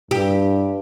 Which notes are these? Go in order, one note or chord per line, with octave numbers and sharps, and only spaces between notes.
G2 G4